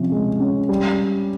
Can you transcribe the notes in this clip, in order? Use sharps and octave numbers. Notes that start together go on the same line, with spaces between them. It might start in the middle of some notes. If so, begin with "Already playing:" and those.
Already playing: C3 F3 C#4
G#3
C#4
G3